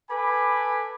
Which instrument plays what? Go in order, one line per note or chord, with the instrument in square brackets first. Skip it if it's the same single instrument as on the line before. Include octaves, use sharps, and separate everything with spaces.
[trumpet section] A4 B4 G#5 B5 D6